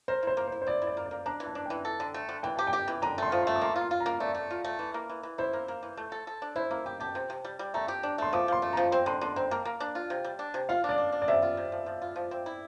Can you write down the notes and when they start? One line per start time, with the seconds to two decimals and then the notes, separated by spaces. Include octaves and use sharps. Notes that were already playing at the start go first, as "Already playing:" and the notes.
0.08 A#4 C5
0.23 E4 C5
0.37 A#3
0.48 E4 C5
0.62 C5
0.67 E4 D5
0.82 E4
0.87 D5
0.97 A#3
1.06 D5
1.11 A#3
1.26 D4 A#5
1.40 E3
1.46 A5
1.55 D4
1.66 E3 G5
1.85 A4
2.00 D3
2.14 A3
2.29 D3
2.43 E3 G5
2.56 G4 A5
2.67 G5
2.73 G4
2.88 E3
3.02 D3 A#5
3.18 A3 C6
3.32 F3
3.42 A3 C6
3.56 D6
3.62 A#3 C6
3.76 F4
3.81 C6
3.91 F4
4.00 A#5
4.06 A#3
4.20 A3 D5
4.35 A3
4.51 F4
4.65 A3
4.79 E3
4.94 A#3
5.10 E3
5.23 E3
5.38 E4 C5
5.53 A#3
5.68 A#3
5.83 E3
5.97 A3
6.12 A4
6.27 A4
6.42 D4
6.56 E4 C5
6.71 A#3 A#4
6.86 G4 G5
7.00 G4 A5
7.15 C3
7.30 C3
7.45 G3
7.59 G3
7.74 A3 A#5
7.88 G4
8.03 D4
8.18 A3 C6
8.33 F3 D6
8.48 F3 C6
8.62 A3
8.73 F3 A#5
8.91 C4 C6
9.06 D3 C6
9.21 D3 C6
9.36 C4 A#5
9.51 A#3 A5
9.65 A#3
9.80 D4
9.95 F4
10.10 C3
10.24 G3
10.39 D4
10.54 C3
10.69 F4 F5
10.84 D4
10.89 D5
10.98 D4
11.12 D4
11.22 D5
11.28 C3 E5
11.42 F4
11.57 C3
11.72 F3
11.86 F3
12.02 F4
12.16 F3
12.31 C4
12.46 E4